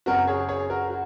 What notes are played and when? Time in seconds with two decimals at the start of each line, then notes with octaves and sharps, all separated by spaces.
0.06 F#1 F#2 F#3 F#4 A#4
0.27 G#4 C#5
0.49 G#4 C#5
0.70 F#4 A#4
0.90 F#4